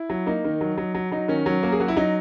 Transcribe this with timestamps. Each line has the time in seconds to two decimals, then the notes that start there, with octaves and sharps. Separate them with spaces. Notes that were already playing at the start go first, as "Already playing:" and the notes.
Already playing: E4
0.10 F#3
0.26 A#3 D#4
0.44 D#3
0.61 F#3
0.78 F#3
0.95 F#3
1.12 F#3 D#4
1.28 D#3 C#4
1.46 F#3
1.63 A#3 A#4
1.72 G#4
1.80 F#3 F#4
1.88 E4
1.96 F#3 D#4